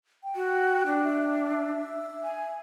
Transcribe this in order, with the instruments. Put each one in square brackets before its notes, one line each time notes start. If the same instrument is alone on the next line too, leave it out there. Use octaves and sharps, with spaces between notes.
[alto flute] G5
[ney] F#4
D4
[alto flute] E5
[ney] G#5